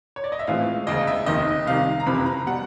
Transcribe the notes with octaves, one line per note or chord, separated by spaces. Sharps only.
C#5
D5
D#5
E5
A2 E3 G#3 C4 F4 F5
E1 D2 C#3 D#5
E5
F1 D#2 D#3 D#5
C2 C3 D#3 F5
A#5
F#1 F2 C3 E3 B5
A#5
B2 G3 F#5